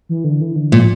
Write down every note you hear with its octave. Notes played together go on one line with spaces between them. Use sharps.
E3
D3
E3
D3
A#2 F3